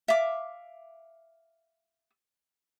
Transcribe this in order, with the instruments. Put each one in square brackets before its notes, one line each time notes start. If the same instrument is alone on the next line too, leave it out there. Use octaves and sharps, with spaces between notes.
[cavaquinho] E5 F5 D6